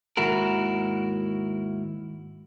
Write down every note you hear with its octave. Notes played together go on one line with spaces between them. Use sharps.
D#2 G#2 E4 F#4 A#4